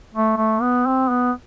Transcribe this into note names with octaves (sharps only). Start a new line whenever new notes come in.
A3
A3
B3
C4
B3